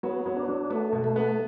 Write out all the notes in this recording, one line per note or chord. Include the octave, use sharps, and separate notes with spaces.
F#3 B3
F#3
D4
F#3
A3 B3
B2
A3
B3